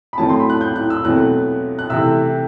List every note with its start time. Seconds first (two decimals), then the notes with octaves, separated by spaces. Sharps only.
0.13 B5
0.18 A2 F#3 A3 C4 A5
0.29 C6
0.40 B5
0.50 F#6
0.61 G6
0.76 F#6
0.90 E6
1.04 E2 B2 F#3 A3 C4 F#6
1.79 F#6
1.90 C3 E3 A3 C4 E6